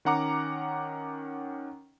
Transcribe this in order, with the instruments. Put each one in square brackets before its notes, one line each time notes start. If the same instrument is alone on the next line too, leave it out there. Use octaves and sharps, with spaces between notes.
[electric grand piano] D#3 C#4 F#5 A#5 D6 C#7